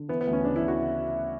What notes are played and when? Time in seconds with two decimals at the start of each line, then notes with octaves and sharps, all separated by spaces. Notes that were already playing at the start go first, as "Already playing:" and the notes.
Already playing: D3
0.09 E3 B3
0.21 B3
0.27 D2
0.33 C#4
0.44 C#3 D4
0.56 E4
0.63 C#3
0.68 F#4